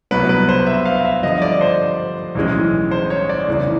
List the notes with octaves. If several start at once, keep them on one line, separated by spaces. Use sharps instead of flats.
C2 B2 F#3 B3 B4
B4
C5
E5
F5
E5
G2 D3 F3 D#5
D5
C5
B1 A2 E3 G#3 C#4
C5
C#5
D5
F1 E2 C#3 E3